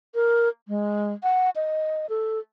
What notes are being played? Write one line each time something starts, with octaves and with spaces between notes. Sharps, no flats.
A#4
G#3
F#5
D#5
A4